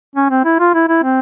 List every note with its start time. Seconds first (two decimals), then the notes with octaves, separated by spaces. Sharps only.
0.16 C#4
0.30 C4
0.45 E4
0.59 F4
0.74 E4
0.88 E4
1.03 C4